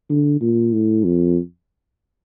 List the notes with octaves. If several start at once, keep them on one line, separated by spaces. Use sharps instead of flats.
D3
A#2
A2
F2